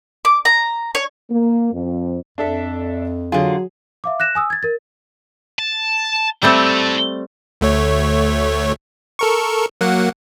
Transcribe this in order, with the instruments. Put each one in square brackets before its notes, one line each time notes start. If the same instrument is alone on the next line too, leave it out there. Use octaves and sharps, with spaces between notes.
[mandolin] D6
A#5
C#5
[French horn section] A#3
F2
[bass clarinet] F2 [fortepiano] D4 A4 E5
[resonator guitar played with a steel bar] D3 F4 [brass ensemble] F#3 [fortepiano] G#4
[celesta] E5 F5 D6
F#6 A#6 E7
G#5 D#6 E6
G#6 A6
A#4 A6
[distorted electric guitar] A5
[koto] G3 A3 C4 [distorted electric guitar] E4 A4
[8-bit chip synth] D2 A3 C#5
A4 A#4 C#6
F#3 A#3 F#5